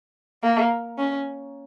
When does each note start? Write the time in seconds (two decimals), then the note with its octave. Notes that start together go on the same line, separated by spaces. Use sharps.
0.43 A#3
0.99 C#4